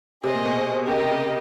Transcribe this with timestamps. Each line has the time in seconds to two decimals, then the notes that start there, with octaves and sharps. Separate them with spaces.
0.24 C3 G#4 C5 D#5
0.34 A#2
0.45 B2
0.87 C#3 G4 A#4 D#5
0.99 C3
1.11 C#3